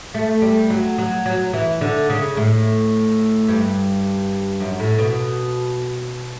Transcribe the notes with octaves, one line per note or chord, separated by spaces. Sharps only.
A3
G3
F#3
F#3
F#3
E3
D3
C#3
A2
G2
F#2
A2
B2